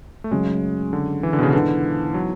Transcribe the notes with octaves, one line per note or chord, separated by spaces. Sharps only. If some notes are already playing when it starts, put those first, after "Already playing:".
A3
F#2 C#3 F#3 G#3 C#4
D3
E3
D3
B2
C#3
G#2 D3 E3 B3
F#3